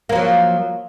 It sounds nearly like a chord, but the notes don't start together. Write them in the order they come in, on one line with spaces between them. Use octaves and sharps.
A#3 F3 F#3